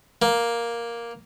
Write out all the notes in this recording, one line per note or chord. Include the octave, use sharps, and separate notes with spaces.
A#3